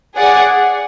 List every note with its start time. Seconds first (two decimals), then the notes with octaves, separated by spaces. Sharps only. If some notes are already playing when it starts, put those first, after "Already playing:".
0.16 G#4 D5 F#5